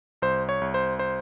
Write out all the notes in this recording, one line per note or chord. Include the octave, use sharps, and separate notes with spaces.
C2 C5
C#5
C2
C5
C5